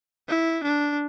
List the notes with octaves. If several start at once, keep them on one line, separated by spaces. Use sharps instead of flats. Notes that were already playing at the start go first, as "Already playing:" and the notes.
E4
D4